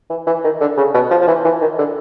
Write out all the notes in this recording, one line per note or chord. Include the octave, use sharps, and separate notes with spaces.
E3
E3
D#3
D3
C#3
B2
F3
F3
E3
E3
D#3
D3